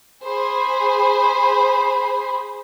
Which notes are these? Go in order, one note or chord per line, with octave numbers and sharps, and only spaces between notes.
G#4 C5 B5